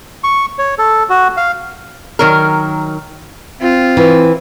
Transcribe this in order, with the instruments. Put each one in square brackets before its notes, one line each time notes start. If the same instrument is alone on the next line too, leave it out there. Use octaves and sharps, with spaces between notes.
[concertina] C#6
C#5
A4
F#4
F5
[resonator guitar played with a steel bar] D#3 F#3 A#4
[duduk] C4 [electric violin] F4
[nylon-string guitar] E3